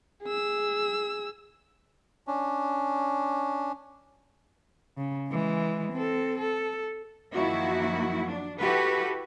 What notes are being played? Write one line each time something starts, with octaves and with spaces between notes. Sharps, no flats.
G#4 E6
C#4 D4
C#3
E3 G#3
C4 A4
A4
F#2 D#3 F3 A#3 E4 F#4
D4
E4 F#4 G4 A4 B4